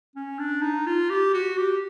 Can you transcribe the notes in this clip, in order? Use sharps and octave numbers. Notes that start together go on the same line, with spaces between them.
C#4
D4
D#4
F4
G4
F#4
G4